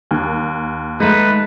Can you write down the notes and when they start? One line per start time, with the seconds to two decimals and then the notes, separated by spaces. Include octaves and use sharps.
0.11 D#2
1.00 G#3 A3 D#4 B4